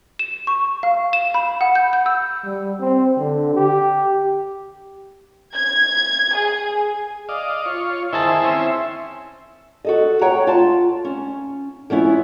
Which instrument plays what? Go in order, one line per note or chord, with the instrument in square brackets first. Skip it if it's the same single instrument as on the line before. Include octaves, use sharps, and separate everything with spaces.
[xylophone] E7
C#6
F5
E7
B5
F#5
G6
G6
E6
[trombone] G3
C4
D3
G4
[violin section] G#6
G#4
[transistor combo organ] D5 D#5 F5
F4 C#5
[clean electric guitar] D#3 G#4 A5 [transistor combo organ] E4 C5 E5
[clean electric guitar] C4 C#4
[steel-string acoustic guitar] F#4 A4 D#5
C#5 F#5 G5 A#5
F4 A5
C#4
F3 B3 C#4 E4